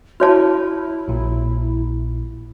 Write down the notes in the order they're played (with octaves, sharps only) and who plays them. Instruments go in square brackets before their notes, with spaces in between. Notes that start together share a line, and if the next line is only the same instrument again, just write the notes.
[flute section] E4 [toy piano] F#4 C#5 A5 [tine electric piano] F6
[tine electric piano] A#1 A#2